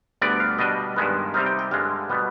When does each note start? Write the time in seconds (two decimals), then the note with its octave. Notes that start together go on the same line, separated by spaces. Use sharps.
0.22 D2 D3 G3 B3 D5
0.40 F5
0.58 B2 G3 D4 D#5
0.96 G2 D#3 G#3 B3
1.34 C3 G3 C4 D#4 F5
1.46 G5
1.59 G5
1.71 G2 D3 G#3 F5
2.10 B2 G3 B3